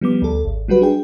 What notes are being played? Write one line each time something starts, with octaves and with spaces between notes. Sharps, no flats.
F3 G3 B3 D6
D2 A4
G#1
F#3 G3 F#4 B4
D4 G#4 G5